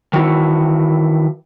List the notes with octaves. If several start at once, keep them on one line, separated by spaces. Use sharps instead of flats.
D#3 E3 F#4